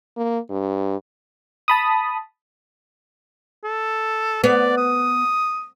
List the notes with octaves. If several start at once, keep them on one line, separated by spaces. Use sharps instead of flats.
A#3
G2
A5 B5 D#6
A4
B3 D5
D#6